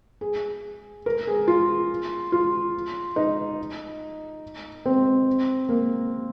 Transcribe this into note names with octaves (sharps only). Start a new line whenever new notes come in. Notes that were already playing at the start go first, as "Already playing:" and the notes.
G#4
A#4
G#4
F4
F4
D#4
C4
A#3